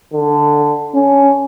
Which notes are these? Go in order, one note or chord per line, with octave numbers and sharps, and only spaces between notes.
D3
C#4